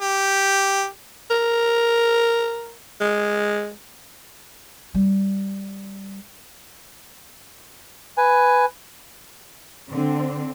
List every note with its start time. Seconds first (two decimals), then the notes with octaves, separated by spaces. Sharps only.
0.01 G4
1.30 A#4
3.01 G#3
4.95 G3
8.17 B4 G#5
9.91 D3 C4